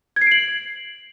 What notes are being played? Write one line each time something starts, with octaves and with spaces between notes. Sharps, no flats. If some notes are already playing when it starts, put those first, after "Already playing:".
G#6
C7
D7
F#7